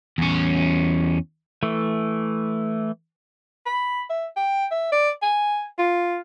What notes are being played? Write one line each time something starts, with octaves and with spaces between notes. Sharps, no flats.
E2 C#4
E3 A3
B5
E5
G5
E5
D5
G#5
F4